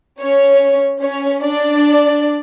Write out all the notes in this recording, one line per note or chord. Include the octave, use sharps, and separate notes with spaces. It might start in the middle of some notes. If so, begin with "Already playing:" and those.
C#4 C#5
C#4 C#5
D4 D5